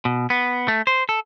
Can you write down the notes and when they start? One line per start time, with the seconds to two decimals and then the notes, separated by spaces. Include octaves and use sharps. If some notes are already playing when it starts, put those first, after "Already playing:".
0.05 B2
0.30 B3
0.68 A3
0.87 C5
1.09 A4